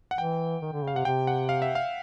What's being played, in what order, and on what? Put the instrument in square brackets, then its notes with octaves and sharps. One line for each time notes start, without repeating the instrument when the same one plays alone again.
[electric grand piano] F#5
[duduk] E3 [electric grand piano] G5
[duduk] D#3
D3
[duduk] C#3 [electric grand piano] F5
[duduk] C3 [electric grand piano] F#5
[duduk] C3 [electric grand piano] G5
[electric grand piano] F#5
F5
E5
F5